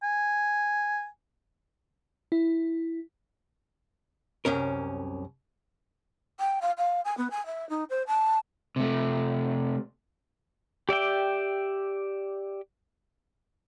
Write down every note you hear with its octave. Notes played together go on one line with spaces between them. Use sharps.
G#5
E4
C2 F#2 C#4 A#4
G5
F5
F5
G#5
B3
G#5
E5
D#4
C5
A5
C3 A3
G4 D5 E5 G5